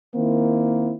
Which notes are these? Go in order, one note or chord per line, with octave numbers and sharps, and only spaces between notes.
D#3 A#3 C4 E4